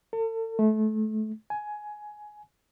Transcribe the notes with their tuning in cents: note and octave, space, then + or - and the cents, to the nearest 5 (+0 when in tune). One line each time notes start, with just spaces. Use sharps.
A4 +40
A3 -25
G#5 +15